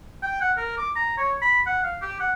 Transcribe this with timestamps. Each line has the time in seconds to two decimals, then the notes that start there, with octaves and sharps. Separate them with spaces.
0.22 G5
0.41 F#5
0.57 A#4
0.78 D6
0.96 A#5
1.18 C#5
1.42 B5
1.67 F#5
1.84 F5
2.02 G4
2.20 F#5